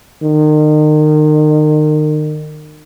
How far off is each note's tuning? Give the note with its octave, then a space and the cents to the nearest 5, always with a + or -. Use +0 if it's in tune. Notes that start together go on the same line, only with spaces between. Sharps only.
D#3 -35